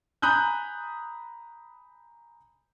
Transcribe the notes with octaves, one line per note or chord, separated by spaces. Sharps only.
G#5 A#5 B5 D#6 F#6 G6